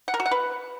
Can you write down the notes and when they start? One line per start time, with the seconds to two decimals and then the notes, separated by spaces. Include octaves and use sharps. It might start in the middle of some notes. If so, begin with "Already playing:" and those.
0.08 F#5
0.14 A#4
0.20 F#4
0.26 F#5
0.31 B4